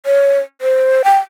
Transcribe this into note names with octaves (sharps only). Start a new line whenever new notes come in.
C#5
C5
G5